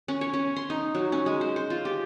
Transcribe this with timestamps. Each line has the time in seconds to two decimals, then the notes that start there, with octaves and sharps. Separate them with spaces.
0.08 C#4
0.21 C#5
0.34 C#4
0.56 C6
0.70 D#4
0.95 F#3
1.12 C#4
1.26 G#3
1.41 C5
1.56 C5
1.70 F4
1.85 G4